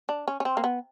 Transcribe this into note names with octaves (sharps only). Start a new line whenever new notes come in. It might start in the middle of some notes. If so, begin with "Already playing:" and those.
D4
C#4
C#4
C4
A#3
B3